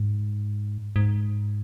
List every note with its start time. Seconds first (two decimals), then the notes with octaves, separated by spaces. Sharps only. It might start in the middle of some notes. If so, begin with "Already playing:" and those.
Already playing: G#2
0.96 G#2